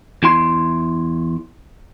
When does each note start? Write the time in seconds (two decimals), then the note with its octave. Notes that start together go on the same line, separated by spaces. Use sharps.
0.23 E2 E4 C6